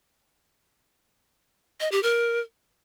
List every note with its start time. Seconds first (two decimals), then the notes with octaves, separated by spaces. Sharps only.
1.80 D#5
1.92 G4
2.03 A#4